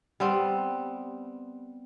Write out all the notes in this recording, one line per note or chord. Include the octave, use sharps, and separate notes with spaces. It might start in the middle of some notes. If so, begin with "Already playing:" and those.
G3 B3 C4